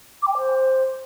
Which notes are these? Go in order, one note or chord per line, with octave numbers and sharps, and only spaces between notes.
D6
G5
G#5
C5